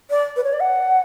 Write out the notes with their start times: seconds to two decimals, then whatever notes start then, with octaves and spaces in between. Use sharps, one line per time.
0.10 D5
0.36 B4
0.44 C#5
0.53 D5
0.61 F#5